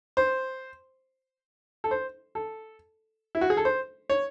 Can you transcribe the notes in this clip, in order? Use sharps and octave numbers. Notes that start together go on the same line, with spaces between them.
C5
A4
C5
A4
E4
F#4
G#4
A4
C5
C#5